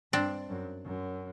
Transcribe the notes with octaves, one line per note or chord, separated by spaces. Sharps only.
G2 C4 D4
F#2
F#2